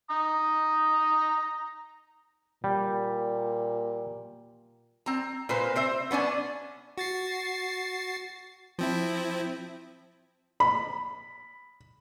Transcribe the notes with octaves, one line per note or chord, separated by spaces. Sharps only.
A#5 D#6
A#2 G3
C4 A#5
A#2 B4 C5
C4 C5 E5
B3 C#4 D4 G#5
F#4 A6 C7
F3 C4 E4
B5